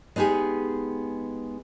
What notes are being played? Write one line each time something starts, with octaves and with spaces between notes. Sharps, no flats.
G#3 B3 D#4 G4 G#4